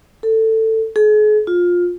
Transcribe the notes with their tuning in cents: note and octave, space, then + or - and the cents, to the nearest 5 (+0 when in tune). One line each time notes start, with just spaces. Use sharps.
A4 +15
G#4 +40
F4 +15